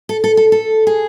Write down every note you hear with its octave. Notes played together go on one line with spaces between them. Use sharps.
A4
A4
A4
A4
G#4